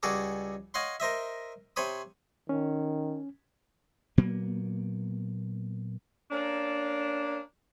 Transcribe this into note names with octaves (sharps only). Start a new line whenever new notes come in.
C#2 G3 F#4 G#4 A4 D6
C#5 D#5 F5 F#5 C6
A#4 C5 D#5 E5
C3 C5 C#5 B5 D#6
D#3 C#4
A#2 F#3 A#3 B3
A#3 C#4 D4